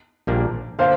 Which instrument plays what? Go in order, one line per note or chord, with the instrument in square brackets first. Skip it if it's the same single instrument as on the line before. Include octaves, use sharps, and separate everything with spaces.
[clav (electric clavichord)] A#1 A#2 G3 A#3 D4
[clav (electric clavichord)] D3 A#3 D4 [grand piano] C5 F5